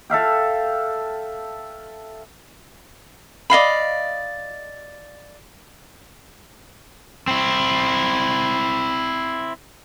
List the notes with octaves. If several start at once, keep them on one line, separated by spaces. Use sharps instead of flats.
A4 E5 F5 G5
D5 D#5 F5 B5
C4 E4